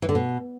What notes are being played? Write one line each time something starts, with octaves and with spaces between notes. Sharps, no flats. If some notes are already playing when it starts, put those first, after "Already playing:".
E3
D3
B2